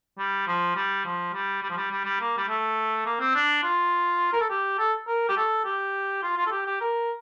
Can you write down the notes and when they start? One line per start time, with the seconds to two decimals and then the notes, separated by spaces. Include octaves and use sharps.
0.18 G3
0.47 F3
0.75 G3
1.05 F3
1.33 G3
1.62 G3
1.70 F3
1.77 G3
1.91 G3
2.05 G3
2.20 A#3
2.38 G3
2.48 A3
3.06 A#3
3.20 C4
3.35 D4
3.63 F4
4.33 A#4
4.41 A4
4.50 G4
4.78 A4
5.07 A#4
5.29 G4
5.37 A4
5.65 G4
6.23 F4
6.37 F4
6.46 A4
6.51 G4
6.66 G4
6.81 A#4